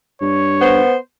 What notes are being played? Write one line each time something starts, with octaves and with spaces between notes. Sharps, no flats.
G2 C#5
B3 C5